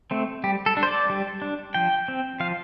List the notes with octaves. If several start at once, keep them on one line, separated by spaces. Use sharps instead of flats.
A3 C4
G3 G4
A4
D4
C5
D5
G3
D4
F3 G5
C4
F3 F5